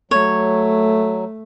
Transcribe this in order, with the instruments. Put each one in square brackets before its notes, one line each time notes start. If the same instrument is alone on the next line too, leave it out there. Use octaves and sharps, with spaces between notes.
[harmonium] F#3 [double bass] A3 [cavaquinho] C#5